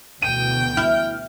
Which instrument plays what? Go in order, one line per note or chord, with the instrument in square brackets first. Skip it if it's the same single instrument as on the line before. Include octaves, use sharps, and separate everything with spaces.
[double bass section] D2 B2 E3 [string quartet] G5 [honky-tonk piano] D#7
[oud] E4 [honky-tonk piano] F6